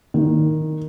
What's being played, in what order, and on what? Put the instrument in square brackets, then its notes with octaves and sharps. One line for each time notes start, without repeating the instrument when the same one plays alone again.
[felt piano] D#3